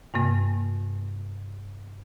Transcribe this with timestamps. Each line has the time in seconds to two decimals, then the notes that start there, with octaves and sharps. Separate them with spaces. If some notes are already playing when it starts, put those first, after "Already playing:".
0.14 G2 C3 A#3